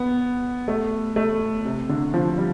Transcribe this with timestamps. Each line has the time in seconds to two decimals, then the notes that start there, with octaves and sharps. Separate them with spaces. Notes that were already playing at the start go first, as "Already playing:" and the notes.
Already playing: B3
0.68 A3
1.16 A3
1.65 C3
1.89 D3
2.14 F3
2.38 G3